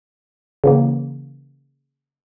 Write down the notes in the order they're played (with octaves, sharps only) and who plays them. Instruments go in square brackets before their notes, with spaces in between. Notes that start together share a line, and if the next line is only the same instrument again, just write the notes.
[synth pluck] C#3 E3 A#3